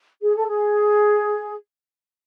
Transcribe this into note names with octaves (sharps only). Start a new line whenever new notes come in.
G#4
A4
G#4